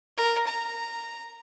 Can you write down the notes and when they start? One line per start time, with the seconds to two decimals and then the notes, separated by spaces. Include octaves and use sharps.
0.17 A#4
0.47 A#5